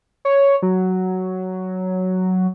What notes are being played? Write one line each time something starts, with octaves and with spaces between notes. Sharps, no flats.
C#5
F#3